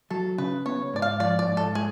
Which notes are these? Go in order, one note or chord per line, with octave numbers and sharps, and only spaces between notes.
F#3 A4
C#3 B4
B3 C#5
G#2 D5
F5
F3 D5
D5
G#2
A4
G#3 G#4